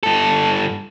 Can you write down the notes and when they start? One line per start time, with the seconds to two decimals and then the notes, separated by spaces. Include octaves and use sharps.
0.03 G2 A4